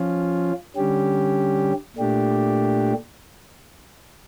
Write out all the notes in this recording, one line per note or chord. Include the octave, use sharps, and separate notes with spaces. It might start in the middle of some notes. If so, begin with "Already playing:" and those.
Already playing: F3 C#4 F4
D3 G3 C#4 G4
A#2 A3 D4 G4